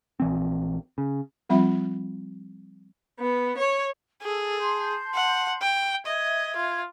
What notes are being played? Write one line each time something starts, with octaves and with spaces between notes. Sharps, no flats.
A#1 E3 C4
C#3
F3 G3 C4 F4 E5 B5
B3
C#5
G#4 A4
A5 C6 G6
F#5
G5
D#5 E5 G#6
F4